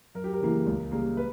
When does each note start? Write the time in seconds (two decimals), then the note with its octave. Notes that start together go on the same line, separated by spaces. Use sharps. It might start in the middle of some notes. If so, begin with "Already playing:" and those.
0.15 F#2 A#4
0.24 G4
0.33 A#4
0.41 C#3 E3 A#3
0.67 C#2
0.92 C#3 G3 A#3
1.17 B4